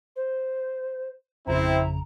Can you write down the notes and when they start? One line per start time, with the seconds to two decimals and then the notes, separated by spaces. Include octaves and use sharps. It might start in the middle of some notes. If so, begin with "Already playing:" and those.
0.16 C5
1.47 G#1 F2 C#3 C4 E4 A#5